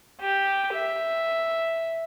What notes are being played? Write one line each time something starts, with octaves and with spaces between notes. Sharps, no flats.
G4
E5